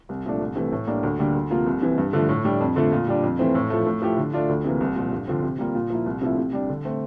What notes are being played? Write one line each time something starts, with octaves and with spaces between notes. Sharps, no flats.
C2
A#2 F3 A3 D4
C2
C3 E3 A3
A2
G3 A#3 D4
D2
D3 G3 A#3
D2
C3 F3 A#3 F4
C2
C3 E3
G2
D3 F3 A3
A2
G3 D4
F2
D3 F3 A3
A#2
G3 D4
F2
E3 A3 C4
A2
F3 A3
A2
F3 A3 E4 G4
D3
A3 D4 F4
D2
C3 E3 A#3
C2
A#2 F3
G2
D3 F3 C4
C3
G3 A#3 F4
A#2
F3 A#3 E4
C2
C3 F3 A3 E4
C3
G3 D4
D3
A3 C4